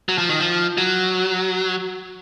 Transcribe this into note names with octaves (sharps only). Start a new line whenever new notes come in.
F#3
F3
D#3
F3
F#3